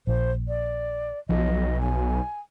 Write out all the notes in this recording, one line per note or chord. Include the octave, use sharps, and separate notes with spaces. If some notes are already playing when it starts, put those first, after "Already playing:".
A#1 C5
D5
B1 F3 D#5
G#5